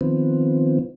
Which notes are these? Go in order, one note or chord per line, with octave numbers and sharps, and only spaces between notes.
D#3 F3 B3 C4